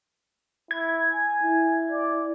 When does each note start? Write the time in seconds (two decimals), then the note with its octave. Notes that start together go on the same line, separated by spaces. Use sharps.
0.71 E4 G#6
1.12 G#5
1.43 E4
1.91 D5